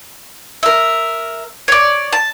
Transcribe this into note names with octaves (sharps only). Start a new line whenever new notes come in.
A#4 E5
C#5 D5
A5